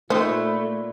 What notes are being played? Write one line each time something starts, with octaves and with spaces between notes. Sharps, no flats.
A#2 A3 D#4 E4 B4 C5